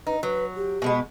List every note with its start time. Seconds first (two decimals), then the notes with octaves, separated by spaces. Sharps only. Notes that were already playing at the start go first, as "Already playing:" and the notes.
0.07 D#4 B4
0.23 F#3 B4
0.56 G4
0.82 B2 G#3 B3